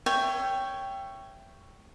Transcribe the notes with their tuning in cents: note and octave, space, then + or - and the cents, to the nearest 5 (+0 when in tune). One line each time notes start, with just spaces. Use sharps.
C#5 +0 E5 +25 G5 +0